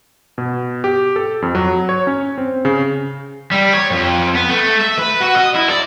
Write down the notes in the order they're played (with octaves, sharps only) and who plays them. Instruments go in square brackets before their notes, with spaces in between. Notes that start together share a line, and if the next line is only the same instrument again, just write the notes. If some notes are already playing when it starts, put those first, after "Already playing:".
[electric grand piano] B2
G4
A4
F2
F#3
C#5
C#4
C4
C#3
[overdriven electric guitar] G3
C#5
F2
B3
A3
E5
B4
F#4
D#5
E4
D5